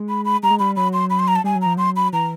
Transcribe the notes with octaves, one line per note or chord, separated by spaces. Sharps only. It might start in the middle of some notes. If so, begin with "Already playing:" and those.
Already playing: G#3
B5
B5
G3 A#5
G#3
G3 B5
F#3 B5
C6
B5
C6
A#5
A5
G3 G#5
F#3
F3 A#5
F#3 C6
B5
E3 A#5